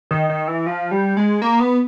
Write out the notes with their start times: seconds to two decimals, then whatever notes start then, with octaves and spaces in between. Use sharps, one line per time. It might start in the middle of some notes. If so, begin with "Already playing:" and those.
0.11 D#3
0.30 D#3
0.48 E3
0.66 F3
0.91 G3
1.17 G#3
1.42 A#3
1.60 B3